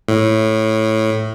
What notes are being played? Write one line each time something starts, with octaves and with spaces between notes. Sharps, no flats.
A2